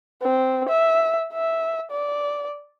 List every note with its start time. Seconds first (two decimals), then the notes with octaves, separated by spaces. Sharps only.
0.22 C4
0.69 E5
1.33 E5
1.91 D5